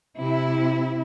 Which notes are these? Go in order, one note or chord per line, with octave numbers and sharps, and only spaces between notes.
C3 E4